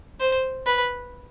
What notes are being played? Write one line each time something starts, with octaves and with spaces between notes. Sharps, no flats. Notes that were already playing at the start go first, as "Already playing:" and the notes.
C5
B4